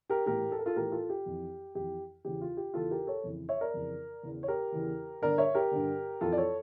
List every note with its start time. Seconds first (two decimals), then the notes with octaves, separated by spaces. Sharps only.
0.10 G4 A#4
0.26 A2 E3 G4 A#4
0.52 A4
0.59 A#4
0.66 F4 A4
0.76 A2 E3 G4 A#4
0.92 F4 A4
1.10 G4
1.26 F2 E3
1.75 F2 E3 G4
2.25 E2 C#3 E3 G4
2.42 F4
2.57 G4
2.74 E2 C#3 E3 F4 A4
2.91 G4 A#4
3.07 A4 C#5
3.24 F2 C#3 E3
3.49 C#5 E5
3.61 A#4 D5
3.74 F2 C#3 E3
4.23 E2 C#3 E3
4.43 C#5
4.48 G4 A#4
4.72 E2 C#3 E3
5.21 G2 D3 A#4 D5
5.38 C#5 E5
5.55 G4 A#4
5.71 G2 D3
6.21 F2 E3 F4 A4
6.32 D5
6.38 A4 C#5